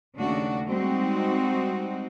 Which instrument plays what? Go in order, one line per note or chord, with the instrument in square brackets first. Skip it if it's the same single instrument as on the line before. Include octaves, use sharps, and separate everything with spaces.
[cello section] D#2 C#3 A3 D4 F#4
G3 G#3 C4 D#4 F#4